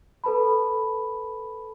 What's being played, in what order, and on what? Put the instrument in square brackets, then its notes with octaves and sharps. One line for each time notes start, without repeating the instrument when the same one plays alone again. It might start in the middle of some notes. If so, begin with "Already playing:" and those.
[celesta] A4 B4 A5 B5